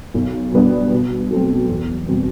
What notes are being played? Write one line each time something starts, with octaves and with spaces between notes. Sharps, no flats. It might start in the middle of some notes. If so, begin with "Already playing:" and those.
B1
B2 G3 B3 D4
B2
F#3 A3 C4
E2
B2 G3 C4